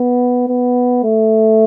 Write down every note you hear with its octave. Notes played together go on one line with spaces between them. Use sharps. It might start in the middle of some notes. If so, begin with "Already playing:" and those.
Already playing: B3
B3
A3